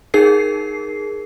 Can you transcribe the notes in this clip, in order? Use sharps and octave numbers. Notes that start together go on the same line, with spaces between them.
D#4 G#4 A#4 C7